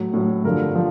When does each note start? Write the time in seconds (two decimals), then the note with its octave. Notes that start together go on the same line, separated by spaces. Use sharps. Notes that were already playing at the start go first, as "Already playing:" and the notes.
Already playing: A2 F#3
0.14 A2 F#3
0.44 G2 D3 F3 A#4
0.75 F3